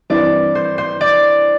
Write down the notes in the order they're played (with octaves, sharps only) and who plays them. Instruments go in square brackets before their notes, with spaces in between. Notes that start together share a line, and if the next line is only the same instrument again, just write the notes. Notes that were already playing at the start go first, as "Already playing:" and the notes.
[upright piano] G2 E3 C4 E4 [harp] D5
[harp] C5
C5
D5